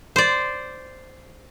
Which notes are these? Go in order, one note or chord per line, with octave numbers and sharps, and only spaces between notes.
C5 D5